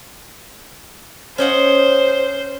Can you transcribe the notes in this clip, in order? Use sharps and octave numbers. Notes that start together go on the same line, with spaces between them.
C#4 C5 D#5 F#5